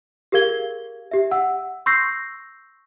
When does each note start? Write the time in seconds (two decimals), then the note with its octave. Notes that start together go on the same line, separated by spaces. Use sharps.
0.32 G4 G#4 A#4 F5 G#6 G7
1.11 G4 E5
1.31 F#5 E6
1.86 C6 C#6 E6 G6 A#6 C7